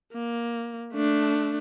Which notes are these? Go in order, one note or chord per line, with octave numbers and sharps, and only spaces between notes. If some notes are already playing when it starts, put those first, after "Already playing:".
A#3
A3 D4